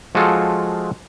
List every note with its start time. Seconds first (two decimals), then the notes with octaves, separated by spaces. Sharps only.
0.15 F3 G#3 F4 F#4 G#4 A4